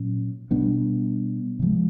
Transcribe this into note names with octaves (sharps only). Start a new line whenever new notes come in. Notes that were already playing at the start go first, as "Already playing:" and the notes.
Already playing: A#2 F#3 C#4
B2 G3 B3 D4
C3 F3 G#3